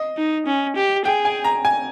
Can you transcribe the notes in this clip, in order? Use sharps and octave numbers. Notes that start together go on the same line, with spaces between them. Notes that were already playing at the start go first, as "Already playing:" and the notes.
Already playing: D#5
D#4
C#4
G4
G#4 G5
G#5
A#5
G#5